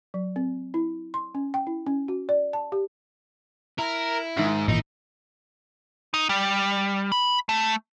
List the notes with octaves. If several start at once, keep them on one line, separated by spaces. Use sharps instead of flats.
F#3
C4
E4
C6
C#4
G5
E4
C#4
F#4
D5
A5
G4
E4 A#4
G#2 D#3 E5
G#1 A#2 E3 D#4
D#4
G3
B5
A3